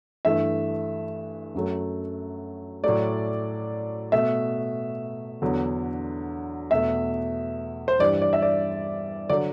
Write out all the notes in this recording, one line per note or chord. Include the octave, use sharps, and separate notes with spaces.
G2 E3 A3 E5
F#2 F#3 A3
A2 F#3 A3 D5
B2 A3 E5
E2 D3 F#3
E2 B2 A3 E5
C5
G2 E3 G3 D5
D5
E5
D5
D3 F#3 D5